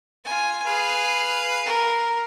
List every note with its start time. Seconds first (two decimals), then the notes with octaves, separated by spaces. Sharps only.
0.25 F4 G#5
0.66 G#4 B4 F5
1.66 A#4